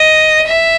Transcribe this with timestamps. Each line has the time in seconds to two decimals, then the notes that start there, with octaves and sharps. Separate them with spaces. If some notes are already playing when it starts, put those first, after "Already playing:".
Already playing: D#5
0.47 E5